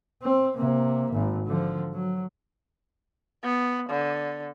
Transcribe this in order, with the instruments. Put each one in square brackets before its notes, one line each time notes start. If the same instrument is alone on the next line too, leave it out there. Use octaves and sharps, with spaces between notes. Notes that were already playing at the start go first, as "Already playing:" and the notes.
[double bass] C4
C3 A#3
G#1
D3 F3
F#3
[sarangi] B3
D3